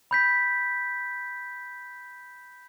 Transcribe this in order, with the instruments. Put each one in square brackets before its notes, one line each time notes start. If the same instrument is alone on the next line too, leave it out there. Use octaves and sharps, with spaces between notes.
[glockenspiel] B5 G6 B6